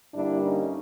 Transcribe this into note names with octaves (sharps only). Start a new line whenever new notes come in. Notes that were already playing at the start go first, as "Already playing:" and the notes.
G2 D3 G3 A#3 D4 E4
C#4 D#4